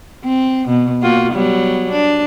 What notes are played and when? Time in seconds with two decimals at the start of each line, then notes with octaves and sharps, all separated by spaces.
0.24 C4
0.68 B2
1.02 A#3 F4 F#4
1.32 F#3 G3 B3
1.90 D4